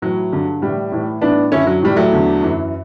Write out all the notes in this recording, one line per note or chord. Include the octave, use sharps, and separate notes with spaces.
A2 E3 F#3
G2 D3
A2 E3 G3
A2 E3
A2 E3 B3 D4
F#2 D3 C#4 E4
F#3
A2 E3 G3
F#3 A3
E2 D3
F#2 E3